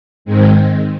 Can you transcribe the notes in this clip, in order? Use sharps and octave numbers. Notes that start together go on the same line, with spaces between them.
G#2 D#3 G#3 C4